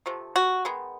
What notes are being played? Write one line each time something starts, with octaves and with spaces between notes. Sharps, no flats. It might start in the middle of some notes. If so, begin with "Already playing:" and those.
C3 F3 A3
F#4
D#3 G#3 B3